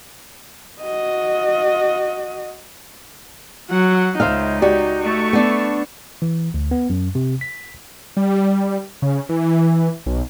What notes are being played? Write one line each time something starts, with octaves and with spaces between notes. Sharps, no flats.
F#4 D#5
F#3 F#5
C#2 D#4 C5 E5 F5
F#4 G4 D5
A3 C#6
B3 D4
E3
D2
B3
F#2
C3
B6
G3
C#3
E3
B1